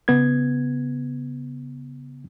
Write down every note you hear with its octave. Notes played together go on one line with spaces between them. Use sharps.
C#3 B3 G#6